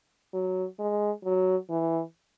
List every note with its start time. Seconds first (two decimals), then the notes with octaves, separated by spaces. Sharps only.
0.33 F#3
0.79 G#3
1.24 F#3
1.70 E3